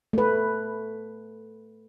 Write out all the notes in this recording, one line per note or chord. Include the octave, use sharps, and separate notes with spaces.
A3 B4